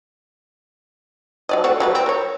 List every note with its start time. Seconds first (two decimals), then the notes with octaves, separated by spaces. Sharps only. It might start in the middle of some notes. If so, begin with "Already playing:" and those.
1.49 F#3 D5 D#5
1.64 A3 C4 F#4
1.80 F#3 G3 B4
1.95 C4
2.06 A#4 C#5